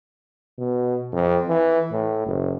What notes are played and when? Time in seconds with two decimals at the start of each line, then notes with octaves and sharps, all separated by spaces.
0.58 B2
1.13 F2
1.49 E3
1.92 A2
2.27 F#1